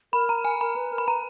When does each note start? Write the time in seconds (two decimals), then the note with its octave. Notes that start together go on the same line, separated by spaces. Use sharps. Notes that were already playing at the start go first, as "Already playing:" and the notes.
0.13 A#4 B5
0.29 A#5
0.45 G#5
0.61 A#4 B5
0.76 B4
0.92 A#4
0.98 B5
1.07 B4 A#5